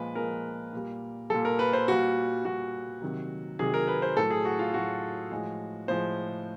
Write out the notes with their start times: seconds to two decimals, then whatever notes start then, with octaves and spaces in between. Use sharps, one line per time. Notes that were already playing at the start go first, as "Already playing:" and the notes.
Already playing: A#2 F3 G#3 B4
0.15 A#2 F3 G#3 A#4
0.73 A#2 G3
1.30 A#2 G3 A4
1.45 A#4
1.59 B4
1.73 C5
1.88 A#2 G3 F#4
2.45 A#2 G3 F#4
3.02 C3 D#3 F#3
3.59 C3 D#3 F#3 G#4
3.74 A#4
3.88 B4
4.02 C5
4.17 A2 F#3 A4
4.30 G#4
4.45 F#4
4.59 F4
4.74 A2 F#3 F#4
5.32 A2 F3 G#3
5.88 A2 F3 G#3 C5